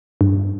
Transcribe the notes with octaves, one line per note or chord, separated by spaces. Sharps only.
G2